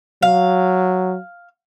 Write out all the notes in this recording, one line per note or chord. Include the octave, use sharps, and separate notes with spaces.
F#3 F5